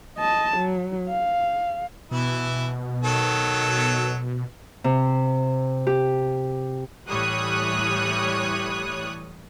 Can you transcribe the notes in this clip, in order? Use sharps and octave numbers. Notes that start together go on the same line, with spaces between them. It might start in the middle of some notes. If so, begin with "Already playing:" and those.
D#5 A5
F#3
F5
B2 E3 E4
D#3 F#3 A4
C3
G4
A2 E3 G3 C#5 D#6 F#6